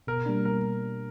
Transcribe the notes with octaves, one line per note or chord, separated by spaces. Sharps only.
B2 A#4
G3 A#3 D4
B2 A#4